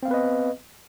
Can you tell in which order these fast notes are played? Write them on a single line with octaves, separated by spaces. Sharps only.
C4 F5 B3 B4 D#5